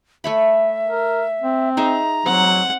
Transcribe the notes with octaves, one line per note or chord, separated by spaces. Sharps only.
A3 C#5 E5 B5
A#4
C4
D#4 G#4 E5 A#5
F#3 C4 F#5